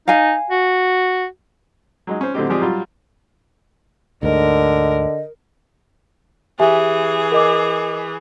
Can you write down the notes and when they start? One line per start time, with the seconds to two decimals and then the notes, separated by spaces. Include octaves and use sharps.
0.08 D#4 F5 G#5
0.50 F#4
2.07 F#3 G#3 D#4
2.21 C#4 C5
2.34 A2 D3 F#3 C4 D#4 G4
2.50 F3 G#3 C4 G4 G#4 D5
2.61 F#3 G3 F4
4.23 D2 G#2 D3 A#4 D#5
6.59 E3 G4 G#4 E5 G#5
7.32 A#4 D#5 D6